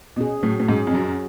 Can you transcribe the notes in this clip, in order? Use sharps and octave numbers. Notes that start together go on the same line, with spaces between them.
B2 C#4 G#4
A2 F#3
A2
G#2 C#4 G#4
F2
F#2 F#3